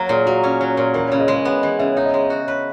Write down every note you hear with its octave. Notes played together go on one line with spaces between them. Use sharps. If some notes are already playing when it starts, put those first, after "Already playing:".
Already playing: F#3 A#3
A#2 G#4
A#3 F#4
C#4
F#3
A#2
E3 A#4
C#5
C#3
D#5
G#3 C#5
B3 B4
E3 D#5
C#3 E5
D#4 E5
D#5
G#3 C#5
D#5
F#4
B4 C#5